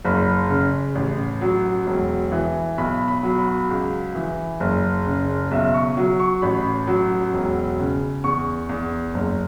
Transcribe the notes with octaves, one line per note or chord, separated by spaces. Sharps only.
F#1 B5
C#3
A1
F#3
E1
E3
B1 B5
B5
F#3
B5
C#2
E3
F#1
C#3
B1 E5
C#6
F#3
C#6
A1 B5
F#3
E1
C#3
E2 C#6
E2
F#1